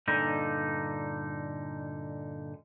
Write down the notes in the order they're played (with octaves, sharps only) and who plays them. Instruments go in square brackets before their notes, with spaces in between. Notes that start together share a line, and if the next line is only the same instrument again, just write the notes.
[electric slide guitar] G2 A#2 D3 D#4